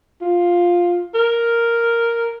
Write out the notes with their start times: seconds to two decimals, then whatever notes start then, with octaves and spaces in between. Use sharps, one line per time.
0.21 F4
1.14 A#4